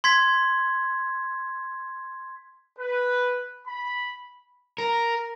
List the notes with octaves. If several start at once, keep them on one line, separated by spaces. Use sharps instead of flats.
C6 G#6 B6
B4
B5
A#4